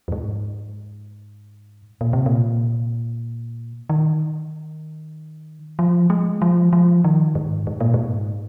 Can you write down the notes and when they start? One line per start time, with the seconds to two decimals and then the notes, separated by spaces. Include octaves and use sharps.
0.08 F2
0.12 G#2
2.01 A#2
2.13 C3
2.26 A#2
3.89 D#3
5.79 F3
6.10 G#3
6.42 F3
6.73 F3
7.04 D#3
7.35 G#2
7.67 G#2
7.81 A#2
7.94 G#2